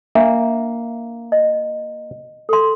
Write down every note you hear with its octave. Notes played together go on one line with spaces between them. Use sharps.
A#3 D4 E5
D#5
A4 C6